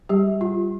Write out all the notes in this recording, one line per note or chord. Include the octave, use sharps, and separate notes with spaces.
G3 G4
F4